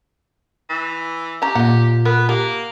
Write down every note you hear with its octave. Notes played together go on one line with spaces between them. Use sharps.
E3
C#4 G4 A#5
A#2 D#5 F#5
B3 A#4
A#3 G4